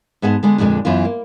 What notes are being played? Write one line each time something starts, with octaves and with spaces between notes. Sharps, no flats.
G#2 B3 G#4 F#5 A5
D3 G#3 B3
F2 A#2 D3 G#3 D4
F#2 E3 B3 F4
A#3